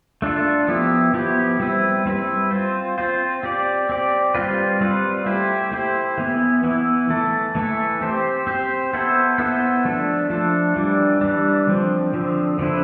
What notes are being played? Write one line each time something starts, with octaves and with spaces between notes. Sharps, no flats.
A3 D4 F4 A4
F3 B3 E4 G4
F3 B3 E4 G4
G3 C4 E4 B4
G3 C4 E4 B4
C4 F4 C5
C4 F4 C5
C4 G4 D5
C4 G4 D5
G3 C4 F4 B4
G3 C4 F4 B4
A3 E4 G4 C5
A3 E4 G4 C5
E3 B3 E4
E3 B3 E4
E3 A3 E4 A4
E3 A3 E4 A4
C4 G4 C5
C4 G4 C5
B3 E4 A4 C5
B3 E4 A4 C5
F3 A3 D4 A4
F3 A3 D4 A4
E3 G3 D4
E3 G3 D4
D3 F3 C4
D3 F3 C4
D3 F3 C4 E4 B4